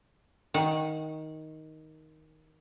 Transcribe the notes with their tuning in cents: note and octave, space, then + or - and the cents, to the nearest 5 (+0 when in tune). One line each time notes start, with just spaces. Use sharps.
D#3 +10 F#5 -20